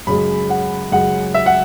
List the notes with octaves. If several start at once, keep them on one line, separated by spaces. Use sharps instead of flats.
F#2 C#3 G#3 B5
F#5
F#2 C#3 G#3 F#5
E5
F#5